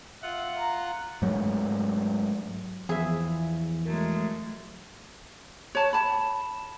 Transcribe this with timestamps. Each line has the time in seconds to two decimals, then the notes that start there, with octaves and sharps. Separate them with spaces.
0.22 F4 E5 F#5
0.58 A#5
1.22 G#2 F#3 A3
2.89 E2 F3 G#4 E5
3.85 F#3 G#3 A3 A#4
5.75 C#5 A5
5.93 A5 B5